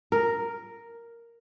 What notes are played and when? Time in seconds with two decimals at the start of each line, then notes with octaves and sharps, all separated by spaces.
0.12 A#4